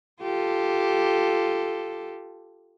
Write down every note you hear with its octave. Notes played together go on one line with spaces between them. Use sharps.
F4 G4 A4